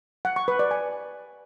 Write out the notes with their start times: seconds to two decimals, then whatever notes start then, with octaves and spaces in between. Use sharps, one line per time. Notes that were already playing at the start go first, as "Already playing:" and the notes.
0.25 F#5
0.36 C#6
0.48 B4
0.59 D5
0.71 G#5